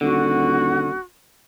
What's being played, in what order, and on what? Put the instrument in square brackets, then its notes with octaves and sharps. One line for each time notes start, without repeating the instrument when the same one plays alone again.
[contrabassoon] D#1 [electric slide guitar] D3 [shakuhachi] F#4